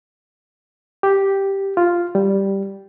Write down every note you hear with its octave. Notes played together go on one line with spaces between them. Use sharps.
G4
F4
G3